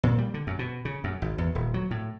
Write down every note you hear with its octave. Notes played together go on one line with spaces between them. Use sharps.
A#2
G3
D3
F#2
B2
C#3
F#2
G#1
E2
D#1
F#3
A2